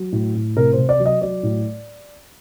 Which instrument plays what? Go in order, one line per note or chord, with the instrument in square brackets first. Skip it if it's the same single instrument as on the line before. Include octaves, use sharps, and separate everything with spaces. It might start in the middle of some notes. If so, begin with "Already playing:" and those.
Already playing: [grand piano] F#3
A2
A2
C3 A#4
C5
C3
D5
F#3
D#5
F#3 D5
A2